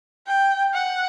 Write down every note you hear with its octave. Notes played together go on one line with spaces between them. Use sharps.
G5
F#5